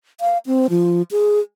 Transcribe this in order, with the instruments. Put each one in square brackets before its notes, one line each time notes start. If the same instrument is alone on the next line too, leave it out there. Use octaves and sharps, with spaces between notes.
[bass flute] F5
C4
F3
G#4